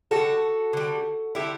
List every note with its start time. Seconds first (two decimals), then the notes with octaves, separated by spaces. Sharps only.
0.11 D3 G3 F#4 A4
0.73 D3 G3
1.35 D3 G3 E4 G4